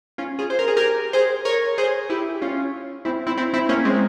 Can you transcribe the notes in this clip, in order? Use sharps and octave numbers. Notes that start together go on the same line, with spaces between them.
C#4 F4
F4 G#4
C5
A#4
G#4
G4 A#4
G#4 C5
A#4 C#5
G#4 C5
E4 G4
C#4 F4
C4 E4
C4 E4
C4 E4
C4 E4
A#3 C#4
G#3 C4